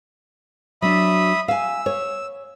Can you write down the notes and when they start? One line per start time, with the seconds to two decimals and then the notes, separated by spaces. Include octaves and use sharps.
0.82 F#3 D4 E5 B5 D#6
1.48 F5 G#5 E6
1.86 C#5